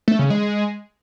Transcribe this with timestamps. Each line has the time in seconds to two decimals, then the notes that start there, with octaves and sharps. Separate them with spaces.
0.08 A3
0.19 C#3
0.30 G#3